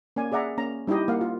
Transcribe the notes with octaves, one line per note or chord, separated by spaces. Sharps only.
A#3 C#4 D5 G#5
G#4 D5 E5 F#5 A#5
A#3 C#4 A#5
G3 D#4 E4 G4 D#5
A#3 F5 F#5
F4